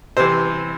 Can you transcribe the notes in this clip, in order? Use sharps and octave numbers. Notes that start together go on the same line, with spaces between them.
C3 E3 C5